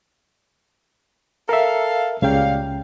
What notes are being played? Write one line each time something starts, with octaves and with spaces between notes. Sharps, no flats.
A4 A#4 E5 F5
C#2 A#2 C#3 G3 F5 G5